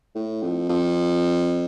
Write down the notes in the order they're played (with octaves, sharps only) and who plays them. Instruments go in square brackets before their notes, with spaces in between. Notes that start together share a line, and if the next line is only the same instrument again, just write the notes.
[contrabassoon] A2
F2
F2